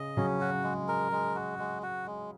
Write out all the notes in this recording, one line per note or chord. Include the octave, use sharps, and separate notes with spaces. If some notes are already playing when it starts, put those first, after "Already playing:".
Already playing: C#3 D#5
C#3 F#3 C#4
F#4
G#3
A#4
G#3
F#4
G#3
F#4
G#3